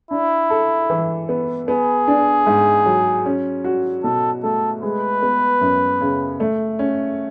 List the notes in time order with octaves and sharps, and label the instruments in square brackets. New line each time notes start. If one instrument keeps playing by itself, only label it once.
[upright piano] D4 [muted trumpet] E4
[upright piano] A4
E3
B3
[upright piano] B3 [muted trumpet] G#4
[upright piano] D4
G#2
F#3
C#4
F#4
[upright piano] B2 [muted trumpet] A4
[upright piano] A3 [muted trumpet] A4
[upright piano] G#3 [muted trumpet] B4
[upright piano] B3
F#2
C#3
A3
C#4